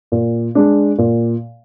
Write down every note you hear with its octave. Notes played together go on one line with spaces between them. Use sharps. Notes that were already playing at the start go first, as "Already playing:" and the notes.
A#2
G#3 D4
A#2